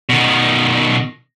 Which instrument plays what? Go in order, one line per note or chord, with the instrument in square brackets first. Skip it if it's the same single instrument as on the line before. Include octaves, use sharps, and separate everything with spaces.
[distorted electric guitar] B2 D#3